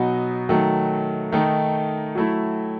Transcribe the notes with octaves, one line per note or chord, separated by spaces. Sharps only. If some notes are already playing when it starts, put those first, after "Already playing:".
Already playing: B2 F#3 B3 D#4
D#3 F#3 A3
D#3 A3 D#4
F#3 A3 E4